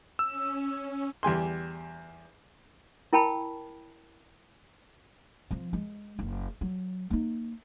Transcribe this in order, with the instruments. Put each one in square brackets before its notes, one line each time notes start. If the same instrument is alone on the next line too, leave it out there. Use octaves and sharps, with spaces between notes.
[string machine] C#4 [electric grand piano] E6
[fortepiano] E2 G3 G#5 C6
[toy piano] E4 A#4 G5 A5 B5
[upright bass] F3 C4
G#3
F#1
F#3
A#3 D#4